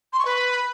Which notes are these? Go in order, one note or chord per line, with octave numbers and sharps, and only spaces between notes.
C6
C#6
B4